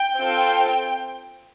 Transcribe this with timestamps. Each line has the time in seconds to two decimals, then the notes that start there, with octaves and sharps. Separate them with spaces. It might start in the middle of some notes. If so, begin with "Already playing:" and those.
Already playing: G5
0.16 C4 F4 A4